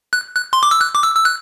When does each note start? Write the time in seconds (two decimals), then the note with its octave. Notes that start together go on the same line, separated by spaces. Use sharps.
0.13 F#6
0.35 F#6
0.53 C6
0.63 D6
0.71 E6
0.81 F#6
0.95 D6
1.03 E6
1.15 E6
1.25 F#6